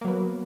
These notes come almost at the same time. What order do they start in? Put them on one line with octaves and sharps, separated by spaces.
A#3 F#3 B3